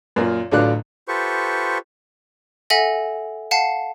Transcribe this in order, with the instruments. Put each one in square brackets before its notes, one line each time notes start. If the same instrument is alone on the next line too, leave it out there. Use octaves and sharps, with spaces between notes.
[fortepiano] F#2 A#2
A1 D3 F#3 D4 F4 F#6
[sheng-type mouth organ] F4 G4 A4 B4 C5 C#6
[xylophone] A4 E5 F#5 G#5 A#6
F5 F#5 A5 C7